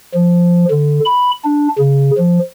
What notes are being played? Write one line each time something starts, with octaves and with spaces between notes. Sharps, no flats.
F3
D3
B5
D4
C#3
F3